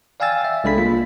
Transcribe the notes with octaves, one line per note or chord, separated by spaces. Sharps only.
D5 F5 G5 G#5 E6 A6
E5
C2 G#3 D4 A4 B5 B6
A#3 F4